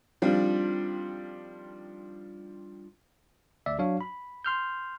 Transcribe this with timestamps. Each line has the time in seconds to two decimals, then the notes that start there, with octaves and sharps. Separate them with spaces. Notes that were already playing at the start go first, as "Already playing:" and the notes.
0.22 D#3 F3 G3 C4 D4 F4
3.66 D2 D5 E5
3.78 F#3 D4 F#4 C#5 F5
4.01 B5
4.45 C6 F6 G6